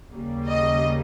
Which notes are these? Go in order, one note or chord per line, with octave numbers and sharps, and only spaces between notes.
D#2 C#3 G3 A#3
D#5